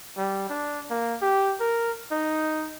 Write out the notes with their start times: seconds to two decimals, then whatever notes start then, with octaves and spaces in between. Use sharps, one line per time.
0.17 G3
0.50 D4
0.90 A#3
1.22 G4
1.60 A#4
2.11 D#4